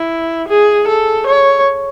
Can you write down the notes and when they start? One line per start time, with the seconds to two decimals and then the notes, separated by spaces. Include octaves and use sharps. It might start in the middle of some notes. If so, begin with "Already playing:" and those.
Already playing: E4
0.49 G#4
0.88 A4
1.27 C#5